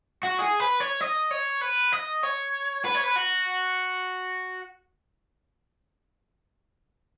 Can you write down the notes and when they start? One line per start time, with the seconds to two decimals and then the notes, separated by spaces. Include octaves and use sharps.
0.23 F#4
0.39 G#4
0.60 B4
0.80 C#5
1.01 D#5
1.31 C#5
1.62 B4
1.93 D#5
2.23 C#5
2.85 B4
2.95 C#5
3.04 B4
3.16 F#4